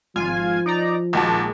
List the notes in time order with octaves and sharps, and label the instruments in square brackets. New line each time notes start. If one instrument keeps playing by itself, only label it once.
[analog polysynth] G#1 F4 G#5 [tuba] F3
[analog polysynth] D#4 D5 A#5
[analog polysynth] A#1 G#3 [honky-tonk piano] D#2 F#4 A5